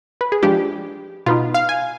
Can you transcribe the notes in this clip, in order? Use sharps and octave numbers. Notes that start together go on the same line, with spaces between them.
B4
G#4
F3 G#3 D4 G4
B2 B3 D#4 F4
F5
G#5